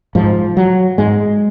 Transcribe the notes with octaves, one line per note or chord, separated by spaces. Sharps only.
G#2 F3
F#3
G#2 G#3